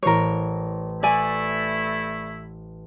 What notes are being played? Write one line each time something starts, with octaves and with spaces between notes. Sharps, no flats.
A1 A#4 C5 C#5 A#6
A3 E4 D5 G#5